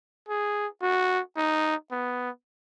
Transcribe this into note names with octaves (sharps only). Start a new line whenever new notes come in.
G#4
F#4
D#4
B3